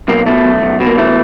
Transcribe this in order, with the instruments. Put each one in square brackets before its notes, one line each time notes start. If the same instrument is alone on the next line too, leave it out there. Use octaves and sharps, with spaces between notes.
[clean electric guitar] B1 A#3
B2 A3
B1
B1
B2
A#3
E3 A3